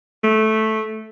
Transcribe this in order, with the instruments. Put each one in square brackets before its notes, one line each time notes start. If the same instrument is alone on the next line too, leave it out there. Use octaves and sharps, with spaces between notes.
[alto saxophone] A3